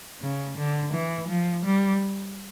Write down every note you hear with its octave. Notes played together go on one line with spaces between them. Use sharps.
C#3
D3
E3
F3
G3